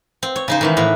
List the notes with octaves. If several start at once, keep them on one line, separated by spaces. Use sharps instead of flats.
C4
C#5
C#3 D#4 C5
D#3 E3 G#3
A2 B3 A#5